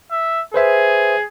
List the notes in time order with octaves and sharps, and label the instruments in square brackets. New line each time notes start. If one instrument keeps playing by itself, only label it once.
[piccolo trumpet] E5
[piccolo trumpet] G#4 [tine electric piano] B4 C5 E5